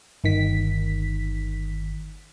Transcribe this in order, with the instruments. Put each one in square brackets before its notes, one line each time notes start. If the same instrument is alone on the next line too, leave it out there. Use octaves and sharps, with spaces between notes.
[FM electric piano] G1 D#3 B6